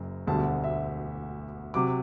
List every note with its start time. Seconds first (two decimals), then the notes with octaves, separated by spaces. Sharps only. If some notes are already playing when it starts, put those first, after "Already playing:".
Already playing: F#1 F#2
0.27 E1 D2 D3 G3 A5
0.64 E5
1.74 C3 F#3 D6